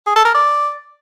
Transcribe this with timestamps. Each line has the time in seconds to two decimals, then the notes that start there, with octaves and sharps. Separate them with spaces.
0.07 G#4
0.16 A4
0.25 A#4
0.34 D5